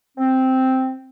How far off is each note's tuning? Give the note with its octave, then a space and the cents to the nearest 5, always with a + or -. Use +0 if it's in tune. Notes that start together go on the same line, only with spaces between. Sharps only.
C4 -5